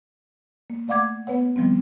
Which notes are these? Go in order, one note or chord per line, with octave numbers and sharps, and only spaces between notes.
A#3
A3 D5 F5 F#5 D6 G#6
B3 B4 C#5 F#5
D#3 F3 G3 B3 C4